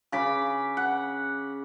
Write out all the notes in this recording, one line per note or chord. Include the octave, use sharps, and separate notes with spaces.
C#3 B5 D6
F#5